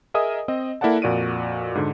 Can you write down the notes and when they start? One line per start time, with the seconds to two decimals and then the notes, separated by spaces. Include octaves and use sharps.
0.14 G#4 A#4 D#5 E5 G#5 D#6
0.48 C4 D#5
0.81 A#3 E4 A4 D5 F#5 A5
1.02 F2 A#2 F#4 D5 D7 D#7
1.75 G#2 D3